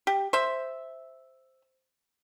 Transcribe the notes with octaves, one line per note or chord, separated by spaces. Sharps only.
G4
C5 E5